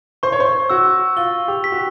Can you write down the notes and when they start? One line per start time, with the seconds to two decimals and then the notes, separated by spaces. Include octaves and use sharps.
0.23 C5 C#6
0.32 C#5
0.40 C5
0.70 F#4 E6
1.17 F4 G7
1.48 G4
1.64 B6
1.72 F#4